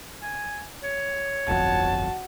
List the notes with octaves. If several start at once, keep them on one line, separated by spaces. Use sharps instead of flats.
G#5
C#5
D1 G1 F2 F#4 A5